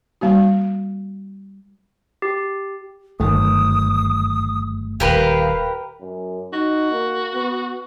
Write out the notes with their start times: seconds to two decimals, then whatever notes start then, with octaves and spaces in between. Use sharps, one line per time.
0.21 G3 A#3 F#4
2.22 G4
3.20 G1 F#2 D#3 A3 D#6
5.00 D#1 G4 A#4 B4 F5
6.01 F#2
6.53 D#4 F#4
6.92 A#3
7.34 B3